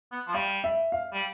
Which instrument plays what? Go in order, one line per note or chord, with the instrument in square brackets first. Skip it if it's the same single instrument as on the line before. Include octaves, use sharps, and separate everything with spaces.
[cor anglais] B3
F3
[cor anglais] G3 [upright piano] F5
[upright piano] E5
F5
[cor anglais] G3